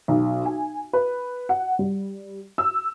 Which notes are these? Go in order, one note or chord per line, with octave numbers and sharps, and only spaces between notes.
B1
G#5
B4
F#5
G3
E6